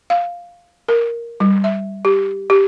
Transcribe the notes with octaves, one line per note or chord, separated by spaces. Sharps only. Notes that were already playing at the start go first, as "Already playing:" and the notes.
F5
A#4
G3
E5
G4
G4